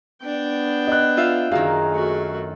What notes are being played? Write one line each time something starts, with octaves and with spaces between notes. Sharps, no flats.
B3 D4 G5
D#5 F#6
F4 E5 F5
F#2 D#3 G#4 F5
A3 F#4